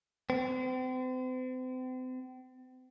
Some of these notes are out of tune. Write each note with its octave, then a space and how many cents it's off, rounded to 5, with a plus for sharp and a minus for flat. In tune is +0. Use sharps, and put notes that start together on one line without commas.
C4 -40